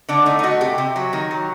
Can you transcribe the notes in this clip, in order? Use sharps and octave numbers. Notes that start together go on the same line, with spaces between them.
D3 D4
A3 D#4
D#4
A3 F#4
C3 G4
C3
F#3
D#3
F#3